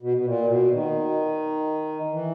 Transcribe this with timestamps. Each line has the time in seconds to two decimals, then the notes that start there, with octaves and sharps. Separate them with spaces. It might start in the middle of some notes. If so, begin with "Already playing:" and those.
0.02 B2
0.17 B2
0.25 A#2
0.49 B2
0.72 D#3
2.13 E3